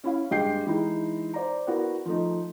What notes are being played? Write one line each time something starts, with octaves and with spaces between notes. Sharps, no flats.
C#4 E4 F5
G2 G#3 G4 G5 G6 C7
E3 G#3 D#4 E4
C5 D5 A#5
B3 E4 F#4 A#4
F3 A3 D#4